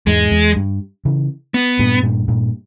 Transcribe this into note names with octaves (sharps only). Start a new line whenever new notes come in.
E2 G#2 G#3
E2
G2
C#3 E3
B3
G2 A#2
G2 A#2
G2 A#2